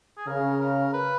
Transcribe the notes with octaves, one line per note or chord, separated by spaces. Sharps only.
G#4
C#3 A#4
A#4
B4